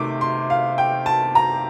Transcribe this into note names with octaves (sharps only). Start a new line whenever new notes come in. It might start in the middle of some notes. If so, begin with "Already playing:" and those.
Already playing: C3 D#3 A3 D6
C6
F5
G5
A5
A#5